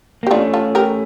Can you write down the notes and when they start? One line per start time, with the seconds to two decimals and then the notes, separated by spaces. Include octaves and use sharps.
0.23 A#3
0.27 G4
0.31 A3 C#4 D4 F4
0.54 F4 A4
0.75 G4 A#4